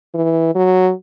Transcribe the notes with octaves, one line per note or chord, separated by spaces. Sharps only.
E3
F#3